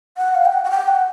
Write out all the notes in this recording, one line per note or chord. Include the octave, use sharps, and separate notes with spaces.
F#5
F5
G5
F#5
F#5
G5
F#5